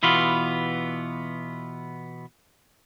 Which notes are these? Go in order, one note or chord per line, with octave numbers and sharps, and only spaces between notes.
B2 E3 B3 F4